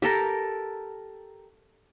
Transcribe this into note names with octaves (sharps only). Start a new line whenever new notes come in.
G4 A4 A#4